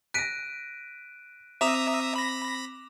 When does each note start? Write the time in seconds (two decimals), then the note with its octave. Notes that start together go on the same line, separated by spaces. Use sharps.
0.14 F#6 A#6 B6 D7 D#7
1.61 C4 E5 A#5 D6 D#6 E7 F7
2.16 B5 A#6